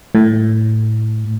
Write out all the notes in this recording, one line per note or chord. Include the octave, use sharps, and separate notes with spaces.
A2